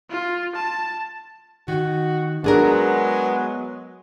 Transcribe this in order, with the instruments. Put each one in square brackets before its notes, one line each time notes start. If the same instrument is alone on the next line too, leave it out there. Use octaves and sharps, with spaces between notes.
[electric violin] F4
A5
[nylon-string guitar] D#3 [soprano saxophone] F#4
[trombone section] F#3 G#3 [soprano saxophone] B3 [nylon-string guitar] D4 G#4 A#4